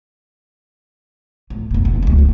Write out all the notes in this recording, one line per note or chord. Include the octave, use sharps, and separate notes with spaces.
A2
F1 B2
C4
F1 D2
D1